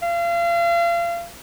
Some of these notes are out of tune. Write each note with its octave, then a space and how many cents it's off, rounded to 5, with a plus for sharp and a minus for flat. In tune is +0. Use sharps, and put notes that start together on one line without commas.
F5 -35